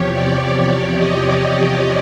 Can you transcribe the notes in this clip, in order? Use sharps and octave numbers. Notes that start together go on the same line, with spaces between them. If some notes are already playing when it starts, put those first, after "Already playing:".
Already playing: E2 C3 F3 G4 C#5
D5
D#5